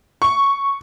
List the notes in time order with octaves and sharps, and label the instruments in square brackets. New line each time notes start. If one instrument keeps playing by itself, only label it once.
[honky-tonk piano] C#6